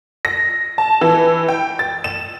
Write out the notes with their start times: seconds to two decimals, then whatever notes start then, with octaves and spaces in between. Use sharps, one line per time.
0.25 A#6
0.78 A5
1.01 E3
1.48 G5
1.79 A6
2.04 E7